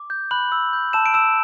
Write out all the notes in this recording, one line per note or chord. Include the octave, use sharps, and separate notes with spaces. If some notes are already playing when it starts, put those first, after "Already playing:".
Already playing: D6
G6
B5 F#6 F#7
E6
G6
A5 E6 E7
D7
E6 E7